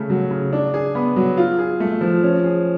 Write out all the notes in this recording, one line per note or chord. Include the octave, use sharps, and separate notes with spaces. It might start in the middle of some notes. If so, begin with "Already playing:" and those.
Already playing: C#3 A3
F#3
C#3
D4
G#4
B3
F#3
F4
G#4
A3
F3
C#4
G#4